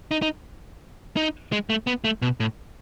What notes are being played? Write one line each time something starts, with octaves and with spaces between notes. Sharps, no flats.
D#4
D#4
D#4
G#3
A3
B3
A3
B2
A2